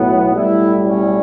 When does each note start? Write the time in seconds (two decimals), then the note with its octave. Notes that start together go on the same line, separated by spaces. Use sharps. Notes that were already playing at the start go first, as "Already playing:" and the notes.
Already playing: B1 A2 F#3 B3
0.34 B1 A2 G3 E4
0.88 C#4